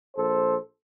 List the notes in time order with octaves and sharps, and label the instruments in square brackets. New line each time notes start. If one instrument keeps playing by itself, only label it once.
[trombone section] A#1 A4 C5